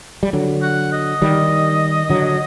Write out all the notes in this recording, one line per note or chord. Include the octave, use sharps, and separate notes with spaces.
G3
D3 F#3
F#5
D#5
D#3 G3
D3 F#3